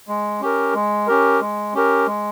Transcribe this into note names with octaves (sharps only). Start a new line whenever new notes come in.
G#3
C#4 G4 A#4
G#3
C#4 G4 A#4
G#3
C#4 G4 A#4
G#3